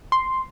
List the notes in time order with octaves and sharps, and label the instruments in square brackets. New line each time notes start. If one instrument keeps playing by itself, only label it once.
[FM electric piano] C6